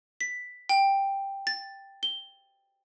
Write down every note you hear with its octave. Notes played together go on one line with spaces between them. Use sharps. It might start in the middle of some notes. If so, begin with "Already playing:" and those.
B6
G5
A6
G7